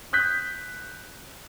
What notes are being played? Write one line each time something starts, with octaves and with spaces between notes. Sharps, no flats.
D#6 F#6 G6 B6